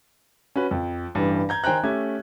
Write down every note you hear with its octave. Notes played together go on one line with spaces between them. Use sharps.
C#4 F#4 B4
F2
A1 G2 E3
A#5 G6 G#6
D#3 C5 G5 G#5 A#5 F#6
A3 C#4 G4 E5 G#6